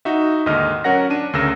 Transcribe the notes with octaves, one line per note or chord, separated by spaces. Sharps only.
D#4 F#4 E5
D#2 G#2 D3 D#5 F6
F#3 C#4 A#4 F#5 A#6
D4 D#7
D2 C#3 A#4 E6 A#6 E7